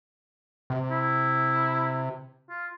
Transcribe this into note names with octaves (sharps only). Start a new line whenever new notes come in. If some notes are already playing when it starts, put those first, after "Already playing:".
C3
E4
F4